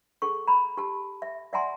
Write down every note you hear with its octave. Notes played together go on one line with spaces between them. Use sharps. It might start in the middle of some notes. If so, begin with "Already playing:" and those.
G#4 A4 C#6
A#5 B5
G4 A5
E5
D5 E5 F#5 G#5 A#5 C6